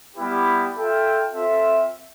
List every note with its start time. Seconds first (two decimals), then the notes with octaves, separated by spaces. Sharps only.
0.16 G3 B3 E4 G4 B4
0.74 F4 A4 E5 G5
1.32 C4 F4 A4 E5